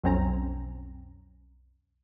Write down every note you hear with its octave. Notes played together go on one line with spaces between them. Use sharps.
B1 F2 C4 C#4 A#5